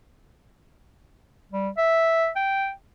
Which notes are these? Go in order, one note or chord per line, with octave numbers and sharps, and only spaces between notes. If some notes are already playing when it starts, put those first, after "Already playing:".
G3
E5
G5